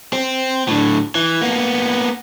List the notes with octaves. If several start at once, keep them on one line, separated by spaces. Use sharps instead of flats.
C4
A2 D3
E3
A#3 B3